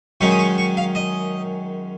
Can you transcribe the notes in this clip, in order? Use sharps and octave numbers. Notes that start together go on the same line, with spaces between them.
F#2 D#3 G#3 C#4 C#6
D#6
C#6
C#6
F5
D#5